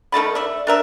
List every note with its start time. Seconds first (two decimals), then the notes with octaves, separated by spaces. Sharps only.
0.12 D#3 A3 A5 B5
0.35 D5 E5
0.67 D4 A#4 E5